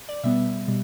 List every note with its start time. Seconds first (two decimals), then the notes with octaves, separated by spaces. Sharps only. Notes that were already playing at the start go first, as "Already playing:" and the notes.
0.09 D5
0.24 B2 G3 B3 E5
0.68 B2 G3